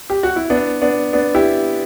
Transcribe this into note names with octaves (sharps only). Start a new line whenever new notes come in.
G4
F#4
E4
B3 D4
B3 D4
B3 D4
E4 G4